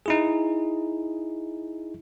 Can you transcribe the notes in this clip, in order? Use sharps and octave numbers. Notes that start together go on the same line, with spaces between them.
D#4 E4 G#4